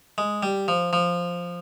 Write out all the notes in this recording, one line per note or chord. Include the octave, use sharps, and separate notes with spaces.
G#3
G3
F3
F3